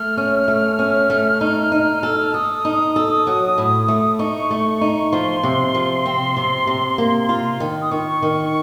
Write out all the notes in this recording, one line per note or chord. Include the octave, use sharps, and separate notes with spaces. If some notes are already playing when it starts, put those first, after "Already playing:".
Already playing: A3 F6
C#4
A3
C#4
A3
D#4
D#4
A4
A4 D#6
D#4
A4
F#3
A2
A3
D#4 C#6
A3
D#4
F3 C6
C3
F3
C4
C3
C3
A#3
F4
D#3
D#6
D#3 C#6
D#3